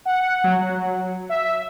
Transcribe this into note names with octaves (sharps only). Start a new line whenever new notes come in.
F#5
F#3
E5